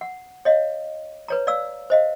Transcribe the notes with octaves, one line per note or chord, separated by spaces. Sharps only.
F#5
C#5 D#5 F5
B4 C#5 A#5
D5 F5 E6
C5 D#5 F5